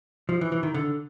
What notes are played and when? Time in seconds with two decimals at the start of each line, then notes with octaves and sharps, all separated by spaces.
0.29 F3
0.41 E3
0.52 E3
0.63 D#3
0.74 D3